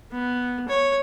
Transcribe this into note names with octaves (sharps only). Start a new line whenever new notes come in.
B3
C#5